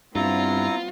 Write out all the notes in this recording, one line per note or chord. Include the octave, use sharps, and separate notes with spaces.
G2 G3 B3 C4 E4 F4 A#5